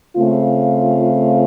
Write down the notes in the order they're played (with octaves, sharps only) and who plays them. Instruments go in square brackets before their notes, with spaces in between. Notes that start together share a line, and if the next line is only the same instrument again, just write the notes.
[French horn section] C#3 A3 C4 F4